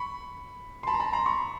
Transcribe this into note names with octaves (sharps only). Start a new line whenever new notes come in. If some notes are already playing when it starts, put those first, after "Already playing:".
Already playing: B5 C#6
C6
A5 B5
A#5
A5 B5
A#5 C6
B5 C#6